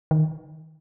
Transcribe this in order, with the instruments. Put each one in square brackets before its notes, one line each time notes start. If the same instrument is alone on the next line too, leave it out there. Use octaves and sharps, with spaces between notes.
[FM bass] D#3